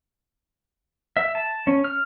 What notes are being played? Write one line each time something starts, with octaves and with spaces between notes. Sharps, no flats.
E5
A5
C#4
F6